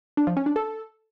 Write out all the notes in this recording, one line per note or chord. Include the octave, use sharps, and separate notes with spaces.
D4
F3
C#4
D4
A4